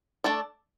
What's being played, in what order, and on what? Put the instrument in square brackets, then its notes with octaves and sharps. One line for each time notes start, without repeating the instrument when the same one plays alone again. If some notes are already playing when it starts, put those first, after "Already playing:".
[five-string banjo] A3 D4 A4 D5